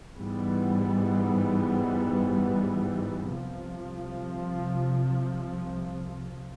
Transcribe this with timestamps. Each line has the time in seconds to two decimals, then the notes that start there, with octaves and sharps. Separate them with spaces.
0.16 G#2 E3 G3 B3
3.29 C2 C3 F3